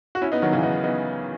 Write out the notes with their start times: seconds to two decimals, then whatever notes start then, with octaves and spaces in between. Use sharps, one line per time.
0.15 F#4
0.22 C#4 E4
0.32 B3 D#4
0.42 D#3 F#3
0.52 C#3 E3
0.63 B3 D#4
0.83 B3 D#4